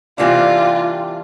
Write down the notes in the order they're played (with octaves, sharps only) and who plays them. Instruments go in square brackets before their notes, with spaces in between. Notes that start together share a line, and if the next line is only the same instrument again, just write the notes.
[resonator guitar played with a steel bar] C3 E3 G3 A#3 D4 [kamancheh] F4